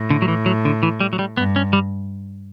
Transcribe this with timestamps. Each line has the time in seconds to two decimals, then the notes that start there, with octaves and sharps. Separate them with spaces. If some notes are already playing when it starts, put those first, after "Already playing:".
Already playing: A2
0.10 D3
0.22 F#3
0.28 E3
0.46 F#3
0.65 D3
0.83 E3
1.00 G3
1.13 F#3
1.19 G3
1.37 G2 B3
1.56 C#4
1.73 G3